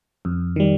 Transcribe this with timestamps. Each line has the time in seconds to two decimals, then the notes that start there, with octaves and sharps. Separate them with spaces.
0.25 F2
0.56 D#3 G3